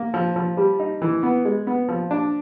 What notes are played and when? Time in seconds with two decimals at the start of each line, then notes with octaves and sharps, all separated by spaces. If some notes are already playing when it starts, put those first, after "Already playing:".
Already playing: A#3
0.14 F3
0.36 F3
0.57 G3
0.79 D#4
1.02 E3
1.23 B3
1.45 G#3
1.67 B3
1.89 F3
2.11 D4